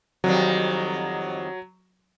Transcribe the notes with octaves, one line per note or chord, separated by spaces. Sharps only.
F2 D#3 F#3 G3